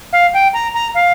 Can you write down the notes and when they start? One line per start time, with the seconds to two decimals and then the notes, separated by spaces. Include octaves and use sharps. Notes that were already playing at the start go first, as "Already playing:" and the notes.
0.13 F5
0.34 G5
0.54 A#5
0.74 A#5
0.95 F5